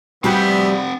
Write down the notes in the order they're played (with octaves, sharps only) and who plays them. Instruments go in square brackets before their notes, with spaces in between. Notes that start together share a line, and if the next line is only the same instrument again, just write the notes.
[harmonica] E3 B3 [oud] G3 F#4 G4 [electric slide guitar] C4 F#5